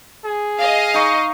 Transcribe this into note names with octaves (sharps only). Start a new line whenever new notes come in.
G#4
D#5 F5
D#4 C#6